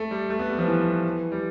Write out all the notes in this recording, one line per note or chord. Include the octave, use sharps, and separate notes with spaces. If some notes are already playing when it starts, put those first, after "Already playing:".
Already playing: A3
G3
A3
B3
G3
F3
E3
G3